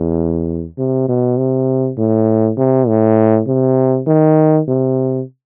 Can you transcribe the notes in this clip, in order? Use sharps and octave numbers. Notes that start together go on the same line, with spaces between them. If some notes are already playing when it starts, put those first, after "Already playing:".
Already playing: E2
C3
B2
C3
A2
C3
A2
C3
D#3
C3